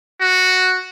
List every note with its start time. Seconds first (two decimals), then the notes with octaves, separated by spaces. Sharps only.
0.21 F#4